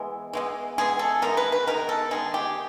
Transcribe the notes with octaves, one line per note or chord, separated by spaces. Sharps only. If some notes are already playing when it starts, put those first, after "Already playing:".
Already playing: E3 G#3 B3
E3 G#3 B3
E3 G#3 B3 G#4
A4
D#3 G#3 B3 A#4
B4
B4
D#3 G#3 B3 A#4
A4
D#3 G#3 B3 G#4
G4